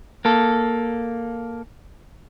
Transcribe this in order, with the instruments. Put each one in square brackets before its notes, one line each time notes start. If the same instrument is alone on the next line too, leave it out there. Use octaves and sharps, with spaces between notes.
[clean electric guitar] A#3 A4